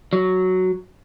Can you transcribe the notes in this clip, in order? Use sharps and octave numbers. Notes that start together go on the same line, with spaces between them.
F#3